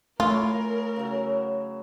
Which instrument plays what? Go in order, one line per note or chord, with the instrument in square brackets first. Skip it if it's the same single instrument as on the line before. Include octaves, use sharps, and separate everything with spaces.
[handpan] A3 [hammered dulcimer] E4 G#4 C#5 [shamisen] F4 [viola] A#4
[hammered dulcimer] C#3 F#3